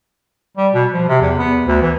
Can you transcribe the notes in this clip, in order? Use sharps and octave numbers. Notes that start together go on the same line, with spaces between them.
G3
B2
F3
C3
E2
B3
D2
E3